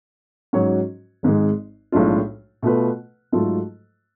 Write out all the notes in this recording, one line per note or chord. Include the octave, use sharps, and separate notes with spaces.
G#2 F#3 C#4 F#4 C#5
G#1 G#2 G#3
B1 A2 G#3 D4 F4
B2 A3 F4 B4
G#2 F#3 A3 F4 A4